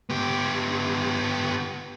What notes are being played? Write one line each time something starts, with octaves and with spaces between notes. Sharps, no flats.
B3 G4